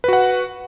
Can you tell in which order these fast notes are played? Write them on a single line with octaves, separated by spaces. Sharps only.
B4 F#4 F#5